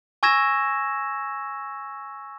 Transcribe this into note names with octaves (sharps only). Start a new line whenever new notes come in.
G#5 C#6 E6 G#6 A#6 E7